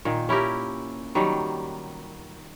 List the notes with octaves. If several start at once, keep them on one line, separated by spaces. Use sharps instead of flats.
A#2 D#3
C#4 E4 G4 A#4
D#3 F#3 G3